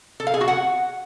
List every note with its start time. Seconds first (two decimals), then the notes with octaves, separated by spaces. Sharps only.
0.20 A4
0.27 F5
0.34 G#4
0.41 F#4
0.48 F#5